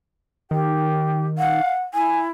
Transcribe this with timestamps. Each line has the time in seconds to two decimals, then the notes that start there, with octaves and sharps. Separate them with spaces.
0.51 D#3 G4 G5
1.38 F5 F#5
1.94 E4 G#5